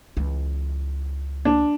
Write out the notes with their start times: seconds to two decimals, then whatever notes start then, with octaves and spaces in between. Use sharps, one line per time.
0.17 C#2 E3
1.45 D4